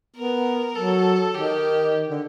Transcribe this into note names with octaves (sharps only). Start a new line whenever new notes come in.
B3 A#4
F#3 A4
D#3 G4
D3